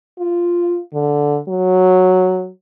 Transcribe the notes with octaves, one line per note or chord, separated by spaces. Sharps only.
F4
D3
F#3